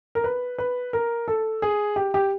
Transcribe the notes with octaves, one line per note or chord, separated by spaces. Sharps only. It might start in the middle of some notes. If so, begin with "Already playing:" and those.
A#4
B4
B4
A#4
A4
G#4
G4
G4